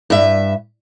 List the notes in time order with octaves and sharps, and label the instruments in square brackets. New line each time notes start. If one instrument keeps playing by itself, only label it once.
[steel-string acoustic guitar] G2 E5